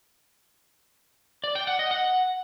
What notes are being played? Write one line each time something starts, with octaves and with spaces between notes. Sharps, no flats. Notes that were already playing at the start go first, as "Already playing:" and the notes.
D5
G5
F#5
D#5
F#5